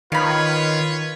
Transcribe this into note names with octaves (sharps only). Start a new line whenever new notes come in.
D#3 F4 B4 C#5 F5 B5